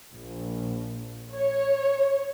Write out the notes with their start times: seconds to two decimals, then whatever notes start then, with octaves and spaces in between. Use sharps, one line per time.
0.12 A#1
1.34 C#5